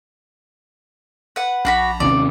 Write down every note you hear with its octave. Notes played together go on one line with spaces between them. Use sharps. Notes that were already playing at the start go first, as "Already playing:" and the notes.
B4 F#5
A#1 D4 F#4 B5
D#2 C3 C#4 D5